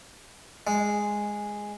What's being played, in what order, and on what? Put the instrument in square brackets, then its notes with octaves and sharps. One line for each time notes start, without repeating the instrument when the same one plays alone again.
[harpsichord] G#3